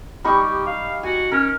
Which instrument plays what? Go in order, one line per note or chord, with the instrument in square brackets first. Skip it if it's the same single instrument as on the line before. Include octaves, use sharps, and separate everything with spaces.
[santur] G3 D#4 C#6 [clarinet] G4
[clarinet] F5
[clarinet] F#4 [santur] G#5
[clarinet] C#4 [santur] A#4